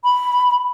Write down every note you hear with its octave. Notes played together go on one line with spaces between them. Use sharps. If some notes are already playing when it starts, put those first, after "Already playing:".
B5